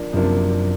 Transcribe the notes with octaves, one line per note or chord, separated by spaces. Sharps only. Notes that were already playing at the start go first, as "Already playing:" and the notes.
Already playing: F3 A#3 D4
F#2 C3 F3 A#3 D4